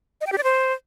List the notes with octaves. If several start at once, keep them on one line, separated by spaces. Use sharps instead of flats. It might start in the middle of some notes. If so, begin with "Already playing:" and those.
D#5
G5
G4
D5
C5